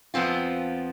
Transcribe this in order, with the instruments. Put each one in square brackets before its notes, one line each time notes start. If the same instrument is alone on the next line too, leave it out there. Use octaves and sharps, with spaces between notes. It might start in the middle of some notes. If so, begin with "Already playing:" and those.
[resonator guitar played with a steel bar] F2 F3 B3 C4 F4